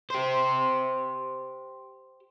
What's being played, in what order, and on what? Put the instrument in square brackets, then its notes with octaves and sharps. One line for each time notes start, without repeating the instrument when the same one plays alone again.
[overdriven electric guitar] G4 C5